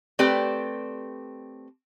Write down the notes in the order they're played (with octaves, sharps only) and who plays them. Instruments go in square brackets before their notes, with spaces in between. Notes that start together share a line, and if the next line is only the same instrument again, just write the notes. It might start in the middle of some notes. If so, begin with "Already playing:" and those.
[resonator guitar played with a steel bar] A3 C4 G4 B4 D5